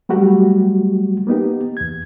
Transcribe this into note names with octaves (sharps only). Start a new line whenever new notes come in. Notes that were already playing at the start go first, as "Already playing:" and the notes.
F#3 G3 A3 F#4 G4
A#3 B3 D#4 G4
E2 G#6